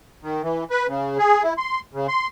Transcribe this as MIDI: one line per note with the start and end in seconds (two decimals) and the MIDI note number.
0.23 0.42 51
0.42 0.64 52
0.70 0.87 71
0.88 1.18 49
1.18 1.43 68
1.43 1.54 64
1.58 1.80 84
1.94 2.07 49
2.08 2.27 84